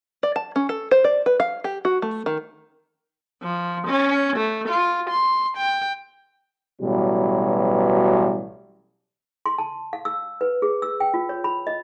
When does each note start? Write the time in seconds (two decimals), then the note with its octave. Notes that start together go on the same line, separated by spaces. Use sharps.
0.23 D5
0.36 A5
0.56 C#4
0.69 A4
0.91 C5
1.04 D5
1.26 B4
1.40 F5
1.64 G4
1.85 F#4
2.02 A3
2.26 D#3
3.43 F3
3.88 C#4
4.37 A3
4.69 F4
5.10 C6
5.58 G5
6.80 A1 B2 F#3 G3
9.46 C6
9.58 A5
9.93 F5
10.05 E6
10.41 B4
10.62 G#4
10.82 E6
11.00 G5
11.14 F4
11.29 C#5
11.44 B5
11.67 D#5